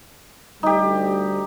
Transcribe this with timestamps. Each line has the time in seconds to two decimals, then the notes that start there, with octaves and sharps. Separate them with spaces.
0.63 D2 G3 D#4 G4